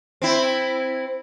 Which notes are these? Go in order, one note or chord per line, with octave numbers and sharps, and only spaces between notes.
C4 E4